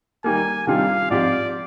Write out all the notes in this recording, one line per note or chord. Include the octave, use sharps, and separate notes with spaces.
D#3 G3 A#3 G#5
C3 D#3 G3 D4 F4 F5
G#2 F3 C4 G4 D5